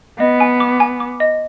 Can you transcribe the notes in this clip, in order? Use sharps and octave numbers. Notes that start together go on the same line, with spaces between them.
B3 D#5
G#5
D6
G#5
D6
D#5